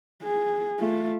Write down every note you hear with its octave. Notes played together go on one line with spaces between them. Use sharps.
G#4
A3 F4